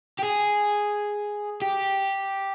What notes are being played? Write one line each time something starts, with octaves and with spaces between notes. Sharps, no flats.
G4
G#4
G4